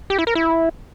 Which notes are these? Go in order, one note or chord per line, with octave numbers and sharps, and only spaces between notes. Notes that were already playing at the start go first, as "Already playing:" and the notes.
G4
E4
A#4
E4